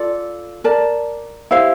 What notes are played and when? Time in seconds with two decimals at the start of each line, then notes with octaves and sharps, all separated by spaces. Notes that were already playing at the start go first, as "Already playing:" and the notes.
Already playing: F4 A4 D5
0.64 A#4 D5 A5
1.51 E4 G4 C5 F5